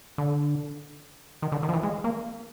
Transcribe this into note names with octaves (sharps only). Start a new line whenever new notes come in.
D3
D#3
D3
D#3
F3
E3
G#3
A#3